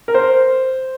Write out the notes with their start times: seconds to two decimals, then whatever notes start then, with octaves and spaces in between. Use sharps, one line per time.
0.08 A#4
0.14 C5